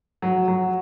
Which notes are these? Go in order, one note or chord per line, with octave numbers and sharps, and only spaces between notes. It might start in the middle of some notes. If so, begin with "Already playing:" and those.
F#3
F#3